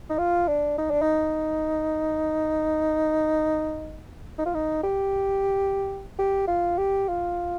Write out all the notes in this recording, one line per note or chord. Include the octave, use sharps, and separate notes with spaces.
D#4
F4
D4
D#4
D4
D#4
D#4
F4
D#4
G4
G4
F4
G4
F4